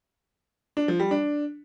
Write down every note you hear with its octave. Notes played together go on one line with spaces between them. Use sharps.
D4
F3
G3
D4